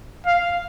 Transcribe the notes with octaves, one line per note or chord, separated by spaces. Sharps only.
F5